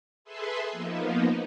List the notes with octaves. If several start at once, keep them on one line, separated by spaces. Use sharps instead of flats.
G#4 A4 B4 E5 C6
F3 A#3 B3 D#4